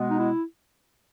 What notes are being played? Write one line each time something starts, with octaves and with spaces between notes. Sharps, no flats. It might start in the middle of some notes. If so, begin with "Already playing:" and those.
Already playing: B2 G#3 B3
D#4
E4